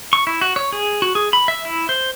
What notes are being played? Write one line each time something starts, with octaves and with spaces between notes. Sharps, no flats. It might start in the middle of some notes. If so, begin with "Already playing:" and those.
C#6
E4
F#4
C#5
G#4
F#4
G#4
B5
E5
E4
C5